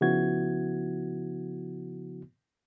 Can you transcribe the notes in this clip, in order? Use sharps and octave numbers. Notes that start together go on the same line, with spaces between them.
C#3 F3 B3 E4 F#4 G#6